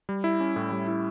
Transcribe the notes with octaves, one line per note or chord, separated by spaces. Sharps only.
G3
E4
C#4
A2
G3
E4